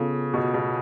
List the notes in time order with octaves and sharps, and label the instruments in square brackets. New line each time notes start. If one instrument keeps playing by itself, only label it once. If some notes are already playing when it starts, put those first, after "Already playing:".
Already playing: [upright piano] C#3 [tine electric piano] B3 F4 A4
[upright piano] B2
B2